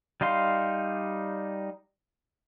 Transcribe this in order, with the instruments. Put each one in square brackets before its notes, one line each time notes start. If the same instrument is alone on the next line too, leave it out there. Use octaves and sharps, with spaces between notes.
[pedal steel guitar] G3 D#4 F5 C6